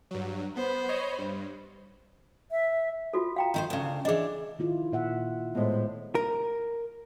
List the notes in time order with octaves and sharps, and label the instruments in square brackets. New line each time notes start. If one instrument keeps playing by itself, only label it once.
[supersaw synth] G2 F#3
[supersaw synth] B3 [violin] C5 B5
[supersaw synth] C#5 D#5
G2
[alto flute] E5
[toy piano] F4 F#4 A4
F5 G5 A#5
[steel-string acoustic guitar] D#3 E4 C5
D2 C#3
[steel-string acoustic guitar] E3 D4 [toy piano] G#4 D#5
[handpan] D#3 E4 F4
A#2 E5 F#5
[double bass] A2 G#3 [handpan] B3 C5
[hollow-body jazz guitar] A#4